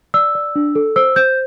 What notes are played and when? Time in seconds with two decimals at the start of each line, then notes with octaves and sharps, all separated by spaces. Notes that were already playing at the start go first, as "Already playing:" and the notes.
0.14 D5 E6
0.35 D5
0.56 D4
0.75 A4
0.96 C5 E6
1.16 C5 G6